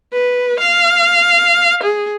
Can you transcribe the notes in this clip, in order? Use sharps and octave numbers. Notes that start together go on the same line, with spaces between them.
B4
F5
G#4